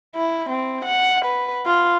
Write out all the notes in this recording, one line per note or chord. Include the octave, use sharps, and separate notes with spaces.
E4
C4
F#5
B4
F4